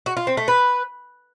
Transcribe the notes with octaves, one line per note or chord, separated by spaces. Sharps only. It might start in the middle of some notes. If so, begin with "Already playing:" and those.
F#4
F4
C4
A3
B4